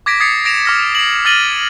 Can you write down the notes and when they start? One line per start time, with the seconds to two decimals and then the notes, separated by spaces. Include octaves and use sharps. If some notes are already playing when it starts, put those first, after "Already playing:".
0.06 D6 G#6 A#6 B6 D7
0.20 D#6 G#6 A6 C7 C#7
0.45 A#6 D7 E7 F7
0.65 D6 F6 A#6
0.95 C7 F#7
1.25 F6 A6 A#6 D#7 F#7 G7